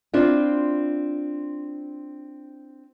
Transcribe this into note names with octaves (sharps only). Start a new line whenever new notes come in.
C4 D4 E4 F4